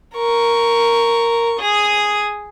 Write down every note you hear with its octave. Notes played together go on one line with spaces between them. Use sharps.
A#4 C#6
G#4 D#6